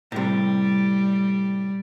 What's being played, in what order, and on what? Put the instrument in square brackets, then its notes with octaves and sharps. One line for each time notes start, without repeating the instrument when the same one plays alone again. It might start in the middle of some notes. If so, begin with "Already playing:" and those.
[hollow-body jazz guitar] A2 C3 [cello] G3